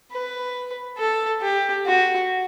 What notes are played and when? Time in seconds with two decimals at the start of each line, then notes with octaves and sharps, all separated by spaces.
0.11 B4
0.97 A4
1.41 G4
1.86 F#4